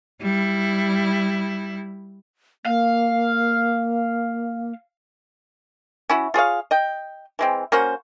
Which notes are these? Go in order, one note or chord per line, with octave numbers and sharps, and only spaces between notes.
G3 E4
A#3 F5
C#4 E4 F#4
F4 G#4 C#5 F5
D#5 G5
E3 G#3 C4
A#3 C#4 F#4 C5